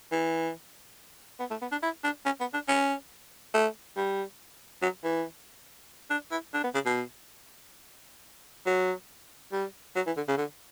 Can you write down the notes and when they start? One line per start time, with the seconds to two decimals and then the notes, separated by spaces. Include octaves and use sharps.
0.12 E3
1.40 B3
1.51 A3
1.62 B3
1.72 D4
1.83 E4
2.04 D4
2.25 C#4
2.40 B3
2.54 D4
2.68 C#4
3.54 A3
3.97 G3
4.82 F#3
5.04 E3
6.10 D4
6.31 E4
6.54 D4
6.64 B3
6.74 C#3
6.86 B2
8.66 F#3
9.52 G3
9.96 F#3
10.07 E3
10.17 D3
10.28 C#3
10.38 D3